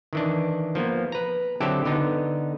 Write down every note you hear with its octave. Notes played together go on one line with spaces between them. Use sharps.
D#3 E3 D4
F3 A#3 B3
B4 A#5
D3 F#3 C4 E4 G4 A4
D3 B3 D#4